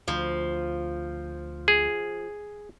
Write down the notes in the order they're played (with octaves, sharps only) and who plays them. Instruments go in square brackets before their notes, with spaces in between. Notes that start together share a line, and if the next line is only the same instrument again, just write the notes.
[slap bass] D2 [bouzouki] F3
[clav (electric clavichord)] G#4